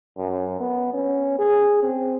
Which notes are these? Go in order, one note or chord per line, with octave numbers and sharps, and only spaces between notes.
F#2
B3
C#4
G#4
C4